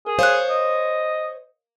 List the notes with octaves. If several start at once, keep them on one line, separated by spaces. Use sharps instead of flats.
G#4 A#4
C5 C#5 F5 F#6
D#5